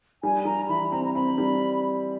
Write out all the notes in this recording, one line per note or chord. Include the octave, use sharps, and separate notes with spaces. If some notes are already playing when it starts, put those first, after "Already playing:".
G3 G#5
G3 A#5
E3 B5
C4 A#5
A#5
C4 B5
G3